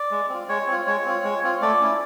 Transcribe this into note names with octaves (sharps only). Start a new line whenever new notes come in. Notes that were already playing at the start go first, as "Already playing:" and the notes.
Already playing: D5
G#3
C4 F4
G#3 C#5
C4 F4
G#3 C#5
C4 F4
G#3
C4 F4
A3 D5
C#4 E4